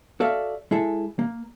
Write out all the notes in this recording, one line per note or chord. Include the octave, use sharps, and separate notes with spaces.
F#4 A4 D5 E5 F5
G#3 E4 G#4 A4
A#3